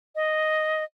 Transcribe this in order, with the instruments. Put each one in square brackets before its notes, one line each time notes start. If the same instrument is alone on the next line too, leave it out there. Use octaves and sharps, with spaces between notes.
[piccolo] D#5